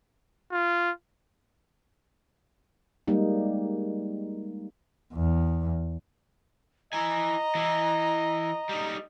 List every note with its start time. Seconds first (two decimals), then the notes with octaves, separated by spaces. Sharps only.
0.52 F4
3.07 G3 G#3 A#3 D#4
5.14 E2
6.93 E4 D#5 G#5 A#5
7.55 E3 E4
8.69 G3 D#4